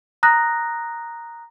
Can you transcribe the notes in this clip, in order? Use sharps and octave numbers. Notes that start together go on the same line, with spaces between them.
A#5 D#6 F#6 A#6